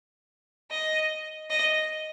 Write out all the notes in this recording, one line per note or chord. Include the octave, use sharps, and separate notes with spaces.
D#5
D#5